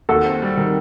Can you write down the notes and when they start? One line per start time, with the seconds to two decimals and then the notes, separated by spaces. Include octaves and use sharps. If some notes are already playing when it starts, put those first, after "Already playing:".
0.09 D#2 F#4 A4
0.25 C4
0.42 G3
0.57 D#3